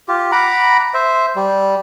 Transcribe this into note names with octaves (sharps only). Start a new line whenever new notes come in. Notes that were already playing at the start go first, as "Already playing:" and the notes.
F4 G4
F#5 A#5 B5 D6
C5 E5
G3